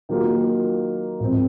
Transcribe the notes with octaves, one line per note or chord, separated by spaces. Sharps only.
D#3 F#3 A#3 F4 A#4
G#2 F3 C4